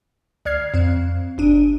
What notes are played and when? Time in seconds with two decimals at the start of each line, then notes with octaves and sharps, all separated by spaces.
0.45 D2 D5 F6 G#6 C7
0.74 F2 C4
1.38 G1 D4 D#7